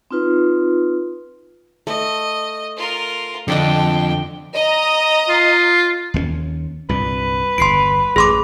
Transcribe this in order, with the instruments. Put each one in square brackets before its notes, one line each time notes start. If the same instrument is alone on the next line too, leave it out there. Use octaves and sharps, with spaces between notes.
[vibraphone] C4 D#4 F4 B4
[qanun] A3 [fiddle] D#5
[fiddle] F4 A#4
[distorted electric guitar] F2 [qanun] D3 D4 D#5 [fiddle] G5
[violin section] D#5 A#5 D#6
[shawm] F4
[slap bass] D#2 G3 C#4
[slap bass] C2 G2 A#2 [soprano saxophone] B4
[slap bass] G1 E2 [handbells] C6 C7 D7
[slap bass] A1 F#2 [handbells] G#4 C6 D6